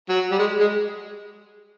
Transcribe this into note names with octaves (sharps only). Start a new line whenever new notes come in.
F#3
G3
G#3
G#3